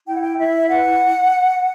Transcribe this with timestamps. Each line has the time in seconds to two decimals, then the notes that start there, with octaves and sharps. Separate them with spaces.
0.07 E4 G5
0.14 F#5
0.21 G5
0.37 E4 E5
0.68 B4 F#5